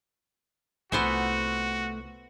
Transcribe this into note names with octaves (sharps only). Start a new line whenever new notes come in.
C2 A3 B3 F4 F#4 C5 E5 G#5